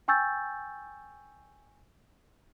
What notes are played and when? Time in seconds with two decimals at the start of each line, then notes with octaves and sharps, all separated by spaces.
0.08 G5 G#5 C#6 E6 G6 A6